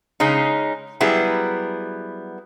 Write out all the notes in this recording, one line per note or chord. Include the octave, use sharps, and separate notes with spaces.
C#3 G#3 C#4 D#4
F#3 G3 B3 E4 G#4